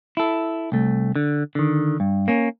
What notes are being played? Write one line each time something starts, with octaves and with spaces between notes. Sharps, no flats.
E4 A4
C2 A3
D3
D3 D#3
G2
A#3 C#4